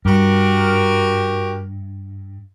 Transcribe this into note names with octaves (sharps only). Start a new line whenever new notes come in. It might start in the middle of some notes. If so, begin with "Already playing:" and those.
G2 F#4 G4 A#4